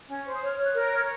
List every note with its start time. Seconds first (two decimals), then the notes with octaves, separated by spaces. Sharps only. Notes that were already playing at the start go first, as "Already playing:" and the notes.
0.08 C#4
0.25 C5
0.35 D#6
0.42 C#5 F6
0.58 C#5 F6
0.64 F#6
0.75 A#4
0.86 F6
0.92 C#5